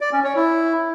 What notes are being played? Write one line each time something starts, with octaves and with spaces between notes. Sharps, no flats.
D5
C#4
C#5
E4